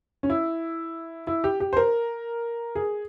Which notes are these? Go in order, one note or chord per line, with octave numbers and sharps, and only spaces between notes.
C#4
E4
E4
G4
G4
C5
A#4
G#4